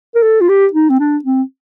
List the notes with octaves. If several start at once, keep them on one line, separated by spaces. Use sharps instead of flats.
A#4
A4
F4
G4
D#4
C4
D4
C4